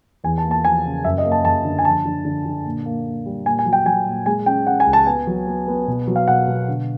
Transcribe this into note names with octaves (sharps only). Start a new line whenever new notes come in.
E2 G#5
A5
A#3
A5
F3 G#5
C#3
F#2 E5
D#5
A#3
A5
F#2 A5
D3
G#5
F3 A5
D3
D3
D3
A#2
A#3
A#3
G3
A#2 G#5
G#5
F#3
G5
F#3 G#5
A#2
G#3 G#5
C#4 G5
C#4 F#5
G#5
C#2
A5
B3 G#5
F#3
B3
B3
B2
F#3
F5
B2 F#5
B2
D3